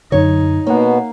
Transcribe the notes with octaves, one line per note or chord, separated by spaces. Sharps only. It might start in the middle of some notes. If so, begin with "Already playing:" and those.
F#2 D3 D#4 C#5
B2 A#3 B3 C#5 F#5